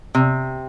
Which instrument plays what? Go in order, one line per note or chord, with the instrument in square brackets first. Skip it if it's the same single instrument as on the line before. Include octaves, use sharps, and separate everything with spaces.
[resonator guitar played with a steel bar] C3